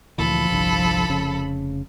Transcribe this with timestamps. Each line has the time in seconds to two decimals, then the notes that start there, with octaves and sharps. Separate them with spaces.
0.18 D2 A#2 E3 F3 A4 B5
0.50 G1 C2 D3
1.09 F1 C#3